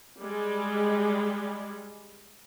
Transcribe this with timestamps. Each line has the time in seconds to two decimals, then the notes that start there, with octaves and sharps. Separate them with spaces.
0.22 G3 G#3